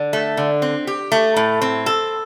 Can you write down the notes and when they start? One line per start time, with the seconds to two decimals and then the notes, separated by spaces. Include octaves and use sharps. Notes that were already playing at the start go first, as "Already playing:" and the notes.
Already playing: D3
0.13 A3
0.37 D3
0.62 C4
0.87 G4
1.12 A3
1.36 A2
1.62 C4
1.86 A4